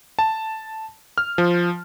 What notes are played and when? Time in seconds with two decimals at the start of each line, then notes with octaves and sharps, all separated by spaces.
0.19 A5
1.18 F6
1.38 F3